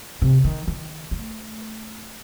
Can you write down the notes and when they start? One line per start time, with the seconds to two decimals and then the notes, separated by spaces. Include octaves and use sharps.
0.22 C3
0.44 D#3
0.67 D#3
1.11 A3